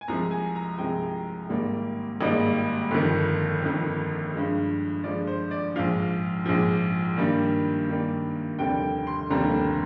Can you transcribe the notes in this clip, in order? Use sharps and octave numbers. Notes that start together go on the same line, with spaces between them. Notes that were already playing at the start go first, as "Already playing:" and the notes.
G#5
C2 C3 F3 G#3 A#5
G#5
A#5
C2 C3 F3 G#3 G5
G#1 G#2 G3 A#3
G#1 G#2 G3 A#3 D#5
G1 F2 D#3
G1 F2 D#3
G2 F3 G#3
G2 F3 G#3 D5
C5
D5
A#1 G#2 F3 F5
A#1 G#2 F3
G2 D#3 G3 A#3
G2 D#3 G3 A#3
F1 D#2 D3 G3 C4 G5
C6
F1 D#2 D3 G3 C4 A#5